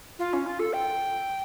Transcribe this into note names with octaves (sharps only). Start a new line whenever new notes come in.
F4
C#4
F4
A4
G5